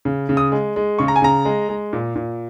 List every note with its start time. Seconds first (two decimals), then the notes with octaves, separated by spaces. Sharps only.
0.05 C#3
0.29 C#3
0.37 D#6
0.52 G#3
0.76 G#3
0.99 C#3 C#6
1.08 A#5
1.16 G#5
1.22 C#3 A#5
1.45 G#3
1.69 G#3
1.93 A#2
2.16 A#2